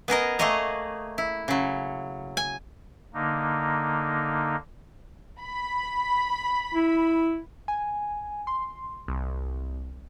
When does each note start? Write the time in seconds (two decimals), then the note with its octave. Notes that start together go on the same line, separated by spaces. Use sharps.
0.08 B3 G#4 A#4 D#5
0.39 A3 A#3 G#4 C#5 D#5 A#5
1.18 E4
1.48 C#3 F#3
2.37 G#5
3.14 D3 A#3 D#4
5.40 B5
6.74 E4
7.68 G#5
8.47 C6
9.08 C2